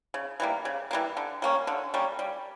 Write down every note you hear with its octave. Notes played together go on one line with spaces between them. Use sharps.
C#3
E3 G3 A#3
C#3
E3 G3 A#3
D3
G3 A#3 C#4
D3
G3 A#3 C#4
G3